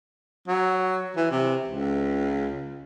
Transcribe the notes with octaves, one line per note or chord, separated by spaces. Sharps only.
F#3
E3
C3
C#2